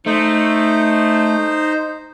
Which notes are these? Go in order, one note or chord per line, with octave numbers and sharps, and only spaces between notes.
A3 D#4 C5